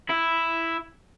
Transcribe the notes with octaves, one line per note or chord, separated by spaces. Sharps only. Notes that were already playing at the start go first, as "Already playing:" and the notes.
E4